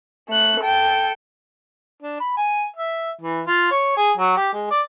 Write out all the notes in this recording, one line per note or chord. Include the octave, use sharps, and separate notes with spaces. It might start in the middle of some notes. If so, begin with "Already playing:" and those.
A3 F#6
A4 G5
D4
B5
G#5
E5
E3
F4
C#5
G#4
F#3
G4
G#3
D5